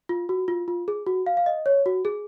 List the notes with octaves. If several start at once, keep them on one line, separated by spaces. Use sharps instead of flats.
F4
F#4
F4
F4
G#4
F#4
F5
F5
D#5
C#5
F#4
G#4